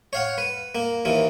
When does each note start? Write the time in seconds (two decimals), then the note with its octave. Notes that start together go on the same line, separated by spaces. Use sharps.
0.13 C#5 F5 F#5
0.38 B4
0.75 A#3
1.05 D#2 E3 A#3